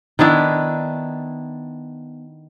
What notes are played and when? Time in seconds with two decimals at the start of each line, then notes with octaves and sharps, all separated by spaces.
0.19 D#3 B3 D4 E4